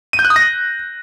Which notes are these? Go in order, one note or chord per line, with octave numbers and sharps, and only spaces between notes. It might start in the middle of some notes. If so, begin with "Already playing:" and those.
D#7
G6
F#6
D#6
A#6